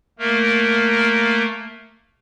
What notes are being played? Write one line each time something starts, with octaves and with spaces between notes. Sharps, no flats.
A3 A#3 A#4